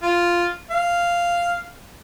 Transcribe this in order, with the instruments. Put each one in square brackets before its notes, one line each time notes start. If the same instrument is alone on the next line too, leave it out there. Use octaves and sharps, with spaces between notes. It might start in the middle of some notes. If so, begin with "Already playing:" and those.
[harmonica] F4
F5